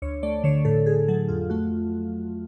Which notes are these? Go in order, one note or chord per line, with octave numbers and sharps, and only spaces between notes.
D2 C#5
A3 D5
D3 C#5
A2 A4
A2 G#4
F#3 A4
F2 F4
A3 F#4